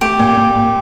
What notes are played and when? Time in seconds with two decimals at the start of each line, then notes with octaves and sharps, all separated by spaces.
0.01 A3 G4
0.19 A#2
0.37 A#2
0.55 A#2